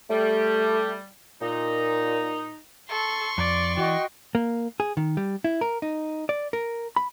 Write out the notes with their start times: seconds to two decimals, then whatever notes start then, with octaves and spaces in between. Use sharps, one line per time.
0.10 G3 A3
1.42 A#2 D#4
2.90 A4 C6 C#6
3.38 F2 D5
3.77 E3 F#4 D#5 G5
4.35 A#3
4.80 G#4
4.97 D#3
5.17 G3
5.44 E4
5.61 A#4
5.82 D#4
6.29 D5
6.53 A#4
6.96 B5